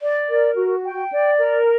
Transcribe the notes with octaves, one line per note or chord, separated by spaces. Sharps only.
D5
A#4
F#4
G5
D5
A#4